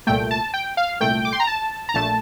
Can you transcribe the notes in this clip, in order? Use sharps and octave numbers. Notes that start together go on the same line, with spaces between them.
C2 A#2 A3 G5
A5
G5
F5
C2 A#2 A3 G5
D6
C6
A#5
A5
A#5
A#1 A#2 A3 A5